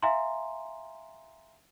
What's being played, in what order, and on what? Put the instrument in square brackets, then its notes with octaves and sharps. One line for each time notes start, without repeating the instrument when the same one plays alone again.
[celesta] E5 F5 G#5 A#5 C6